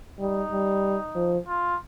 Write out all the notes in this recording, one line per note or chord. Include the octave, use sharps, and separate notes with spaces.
G3 D#4
G3
F3
F4